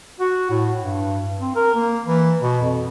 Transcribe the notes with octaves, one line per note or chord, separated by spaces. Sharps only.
F#4
A2
G2
C4
A#4
A#3
E3
B2
F2